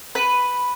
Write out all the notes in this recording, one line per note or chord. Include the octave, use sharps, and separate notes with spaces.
B4